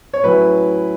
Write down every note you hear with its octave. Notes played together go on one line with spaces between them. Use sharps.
C#5
A2 F#3 C#4 E4 B4